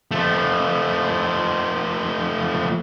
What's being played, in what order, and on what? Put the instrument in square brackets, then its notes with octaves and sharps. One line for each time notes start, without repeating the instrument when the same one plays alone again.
[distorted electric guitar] F3 A3